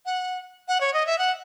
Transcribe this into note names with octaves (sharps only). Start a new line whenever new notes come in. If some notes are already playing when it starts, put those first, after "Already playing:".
F#5
F#5
C#5
D#5
E5
F#5